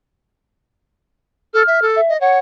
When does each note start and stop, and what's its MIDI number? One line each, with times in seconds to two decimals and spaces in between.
1.54 1.63 69
1.54 1.86 89
1.67 1.80 76
1.82 2.01 69
1.96 2.13 76
2.09 2.19 75
2.21 2.38 73
2.21 2.39 78